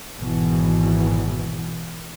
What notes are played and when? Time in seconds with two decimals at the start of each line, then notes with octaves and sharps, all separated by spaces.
0.16 G#1 B2 E3